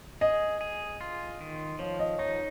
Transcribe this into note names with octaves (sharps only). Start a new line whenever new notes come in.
G#4 D#5
G#4
F4
D#3
F3 C#5
D#5
D#4 C#5